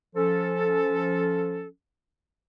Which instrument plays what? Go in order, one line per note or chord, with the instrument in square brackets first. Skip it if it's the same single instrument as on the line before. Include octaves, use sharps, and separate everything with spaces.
[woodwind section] F3 C#4 A4